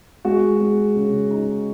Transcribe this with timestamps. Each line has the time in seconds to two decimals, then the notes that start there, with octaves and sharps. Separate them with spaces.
0.25 G#3 F#4
0.60 G#3
0.96 C#3
1.31 D#4